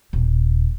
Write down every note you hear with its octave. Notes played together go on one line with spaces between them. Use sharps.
D#1